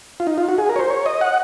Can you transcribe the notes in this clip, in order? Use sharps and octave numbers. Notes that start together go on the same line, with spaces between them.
F4
D#4
F4
F#4
G#4
A#4
C#5
C5
C#5
D#5
F#5